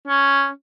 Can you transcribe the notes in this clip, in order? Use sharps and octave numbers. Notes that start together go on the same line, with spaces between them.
C#4